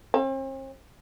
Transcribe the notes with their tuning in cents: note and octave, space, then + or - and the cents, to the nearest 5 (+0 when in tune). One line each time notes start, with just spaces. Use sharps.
C4 +45